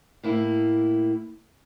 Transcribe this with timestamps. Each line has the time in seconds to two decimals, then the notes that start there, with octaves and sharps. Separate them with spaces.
0.23 A2 A#3 E4